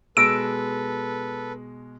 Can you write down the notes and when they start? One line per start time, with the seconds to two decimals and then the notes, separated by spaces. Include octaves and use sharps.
0.17 B2 G#3 A4 B4 E6 A#6 D7